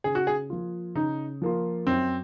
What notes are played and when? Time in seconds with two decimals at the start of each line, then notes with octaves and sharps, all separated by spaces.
0.04 C#3 G#4
0.15 F#4
0.27 G#4
0.50 F3 A#3 F4
0.95 C#3 D#4
1.42 F3 A#3 F4
1.87 F#2 C4